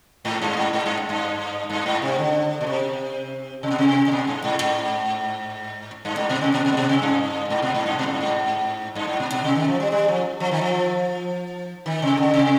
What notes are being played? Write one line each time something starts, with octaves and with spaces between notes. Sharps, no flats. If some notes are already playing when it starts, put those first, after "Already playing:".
G#2
G2
G#2
G#2
G2
G2
G2
G#2
C3
D3
B2
C3
C3
B2
C3
C3
B2
G2
G#2
G#2
G2
G#2
B2
C3
B2
B2
G#2
B2
C3
G2
G#2
B2
G#2
G2
B2
G#2
G2
G#2
G2
G#2
B2
B2
C3
D#3
F3
G3
G3
F3
F3
D#3
F3
D#3
C3
D3
C3